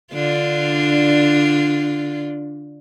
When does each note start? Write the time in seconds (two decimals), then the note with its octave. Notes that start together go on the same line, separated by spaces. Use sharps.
0.14 D3 D4 F4